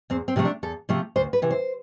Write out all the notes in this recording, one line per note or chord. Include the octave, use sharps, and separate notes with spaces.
E2 C4
C4
C3 F3 A3
D4
E2 A4
C3 F3 A3
D2 C5
B4
C3 E3
C5